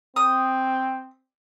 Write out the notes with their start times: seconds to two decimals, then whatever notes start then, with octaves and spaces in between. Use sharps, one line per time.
0.16 C4 D#6